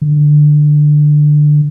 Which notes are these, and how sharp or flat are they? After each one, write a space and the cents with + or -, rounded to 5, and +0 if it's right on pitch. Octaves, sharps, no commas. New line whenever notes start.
D3 +15